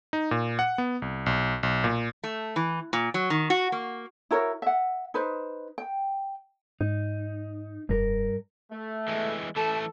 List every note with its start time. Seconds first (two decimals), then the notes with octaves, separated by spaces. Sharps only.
0.13 D#4
0.31 A#2
0.59 F#5
0.78 B3
1.02 C2
1.26 B1
1.63 B1
1.84 A#2
2.24 A3
2.56 E3
2.93 A#2
3.14 F#3
3.30 D#3
3.50 F#4
3.72 A#3
4.31 E4 F#4 A#4 C#5
4.62 E5 F#5
5.14 D#4 B4 C5
5.78 G5
6.81 G#2 D#4
7.89 F1 G2 A#4
8.72 A3
9.08 E3 G#3
9.56 E3 A3 A4 A5